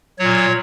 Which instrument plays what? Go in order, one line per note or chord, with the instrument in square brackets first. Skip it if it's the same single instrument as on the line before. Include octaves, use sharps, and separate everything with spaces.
[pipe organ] A#2 F#3 C#5